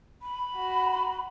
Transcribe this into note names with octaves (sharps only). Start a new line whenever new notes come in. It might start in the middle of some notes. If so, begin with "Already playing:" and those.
B5
F#4